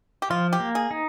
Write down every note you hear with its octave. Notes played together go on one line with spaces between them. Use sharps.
G4
F3 F4
G4
A#3
G#4
D#4